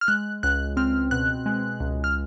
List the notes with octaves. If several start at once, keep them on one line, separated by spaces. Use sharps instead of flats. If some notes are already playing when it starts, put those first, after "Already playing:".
F6
G#3 F#6
C#2 F#6
C4 F6
B2 F#6
G#3
C#2
F6